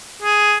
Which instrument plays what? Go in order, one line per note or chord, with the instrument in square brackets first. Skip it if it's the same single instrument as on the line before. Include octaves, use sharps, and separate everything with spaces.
[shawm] G#4